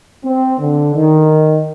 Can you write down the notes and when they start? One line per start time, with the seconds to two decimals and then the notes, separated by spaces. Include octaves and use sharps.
0.25 C4
0.60 D3
0.95 D#3